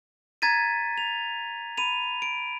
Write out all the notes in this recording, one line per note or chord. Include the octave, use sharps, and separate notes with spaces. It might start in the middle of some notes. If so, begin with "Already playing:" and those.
A#5 G#6 A6 B6 D#7
F7
B5 D#7 F7
D7